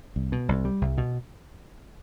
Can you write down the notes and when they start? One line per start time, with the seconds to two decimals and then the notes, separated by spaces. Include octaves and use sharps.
0.16 C2
0.32 B2
0.49 C2
0.65 G3
0.81 C2
0.98 B2